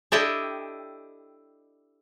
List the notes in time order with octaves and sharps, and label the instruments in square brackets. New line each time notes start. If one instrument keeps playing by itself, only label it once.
[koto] D4 E4 G4 A4 D#5 G5